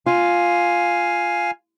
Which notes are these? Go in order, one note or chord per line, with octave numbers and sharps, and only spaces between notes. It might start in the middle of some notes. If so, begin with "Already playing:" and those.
F4 F5 G#5